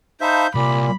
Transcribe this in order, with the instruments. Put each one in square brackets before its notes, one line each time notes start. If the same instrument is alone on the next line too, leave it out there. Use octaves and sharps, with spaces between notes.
[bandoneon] D#4 C5 E5 [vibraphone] F5 A5 B5 [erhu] G6
[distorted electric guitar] C2 [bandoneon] A#2 [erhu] B5 [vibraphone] D6